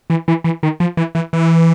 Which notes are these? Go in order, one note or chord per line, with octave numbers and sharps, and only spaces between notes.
E3
E3
E3
D#3
F3
E3
E3
E3